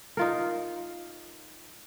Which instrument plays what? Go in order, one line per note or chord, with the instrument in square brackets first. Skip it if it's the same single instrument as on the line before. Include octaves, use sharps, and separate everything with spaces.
[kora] D#4 F4 A#4